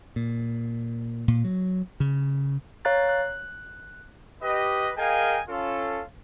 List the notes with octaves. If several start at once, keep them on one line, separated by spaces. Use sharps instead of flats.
A#2
A#2
F#3
C#3
C#5 F5 A#5 F#6 A6
F#6
G4 B4 D#5
G#4 A#4 D#5 F5 G5 G#5
C#4 F4 A4